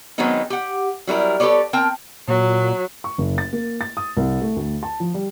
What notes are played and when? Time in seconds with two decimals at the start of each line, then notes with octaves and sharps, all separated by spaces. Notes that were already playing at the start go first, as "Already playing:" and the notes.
0.18 D#3 F#3 G#3 B3 C4 D#4
0.50 G4 F#5
1.07 F#3 G3 E4 A#4
1.40 G4 A4 B4 C#5 D5
1.73 C4 A#4 G5 A5
2.28 A#2 F#3
3.04 C#6
3.18 F#1
3.38 A6
3.53 A#3
3.81 A6
3.97 D#6
4.17 C2
4.41 A3
4.56 D2
4.83 A5
5.00 F3
5.14 G3